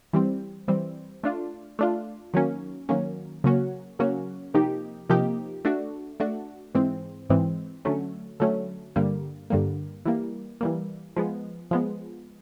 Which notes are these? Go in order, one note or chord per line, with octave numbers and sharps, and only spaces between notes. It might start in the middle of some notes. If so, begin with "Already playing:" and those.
E3 G3 C4
E3 G3 C4
A3 D4 F4
A3 D4 F4
D#3 F#3 A#3 C#4
D#3 F#3 A#3 C#4
C#3 F#3 A#3 C#4 F#4
C#3 F#3 A#3 C#4 F#4
C3 F3 A#3 D#4 G4
C3 F3 A#3 D#4 G4
A3 D4 F#4
A3 D4 F#4
G#2 E3 G#3 C4
G#2 E3 G#3 C4
D3 F#3 A3 C#4
D3 F#3 A3 C#4
G2 D3 G3 A#3
G2 D3 G3 A#3
E3 G3 A#3
E3 G3 A#3
F3 G#3 B3
F3 G#3 B3